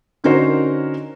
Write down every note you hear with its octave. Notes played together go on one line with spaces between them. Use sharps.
D3 C#4 D#4 F#4 A#4 C5